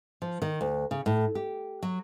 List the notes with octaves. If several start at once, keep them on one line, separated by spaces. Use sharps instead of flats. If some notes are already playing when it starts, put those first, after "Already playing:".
F3
D#3
D2
C#3
A2
G4
F#3